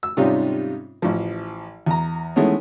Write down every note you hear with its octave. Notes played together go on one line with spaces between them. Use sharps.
E6
G#2 C3 G3 C#4 D#4 F4
A1 F3
E2 A#5
D#3 E3 G#3 A3 B3 C#4